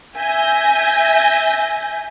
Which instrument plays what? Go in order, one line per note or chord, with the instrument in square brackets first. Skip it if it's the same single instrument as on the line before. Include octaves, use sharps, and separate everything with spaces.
[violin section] E5 G6 A#6 [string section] G#5